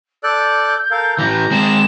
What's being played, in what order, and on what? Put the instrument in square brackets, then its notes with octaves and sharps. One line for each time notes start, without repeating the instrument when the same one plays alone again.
[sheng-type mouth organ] A4 D5 F#6 [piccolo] G6
[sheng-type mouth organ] A4 A#4 F5
[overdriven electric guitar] A2 E3 [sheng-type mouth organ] A#5
[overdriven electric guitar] G#3 C4 [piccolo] E7